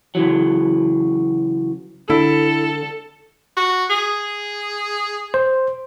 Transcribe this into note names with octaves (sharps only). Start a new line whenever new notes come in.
C#3 E3 F#3
D3 E4 A4
F#4
G#4
C5